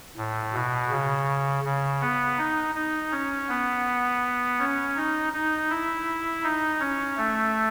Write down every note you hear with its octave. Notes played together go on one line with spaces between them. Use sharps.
A2
B2
C#3
C#3
B3
D#4
D#4
C#4
B3
C#4
D#4
D#4
E4
D#4
C#4
A3